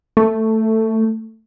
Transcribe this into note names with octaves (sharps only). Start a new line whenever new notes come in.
A3